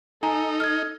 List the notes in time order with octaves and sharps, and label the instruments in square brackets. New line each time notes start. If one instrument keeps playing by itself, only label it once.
[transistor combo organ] D#4 [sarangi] A4 [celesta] G#5 A#5
[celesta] F6 G#6